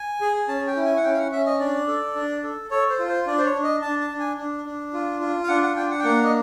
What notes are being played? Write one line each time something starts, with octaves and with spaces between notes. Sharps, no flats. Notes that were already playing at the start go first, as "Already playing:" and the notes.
Already playing: G#5
G#4
C#4 A5
G5
E4
G#5
F#5
C#4 G5
F5
F#5
C#4 E5
D#5
D4 D5
A4
D4
A4
A4 C#5
C5
F4
C5
D4 D5
C5
C#5
D4
D#5
D4 A5
A5
D4
G#5
D4
D4
F4
F4
F5
D4 F#5
F#5
D4 G5
F#5
G5
A#3 F#5
D#5